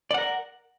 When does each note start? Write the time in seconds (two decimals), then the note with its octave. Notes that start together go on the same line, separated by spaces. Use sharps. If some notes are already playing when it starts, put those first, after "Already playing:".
0.11 D5
0.14 F#5
0.18 A#4